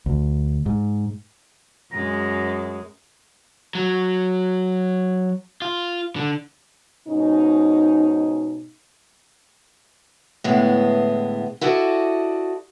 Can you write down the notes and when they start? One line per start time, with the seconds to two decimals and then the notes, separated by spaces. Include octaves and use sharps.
0.06 D2
0.66 G#2
1.92 F#2 G#3 A#5
3.75 F#3
5.62 F4
6.16 D3
7.08 G#2 B2 C#4 D#4
10.44 A2 D3 E3 G#3 B3
11.61 E4 F#4 A4 D5 D#5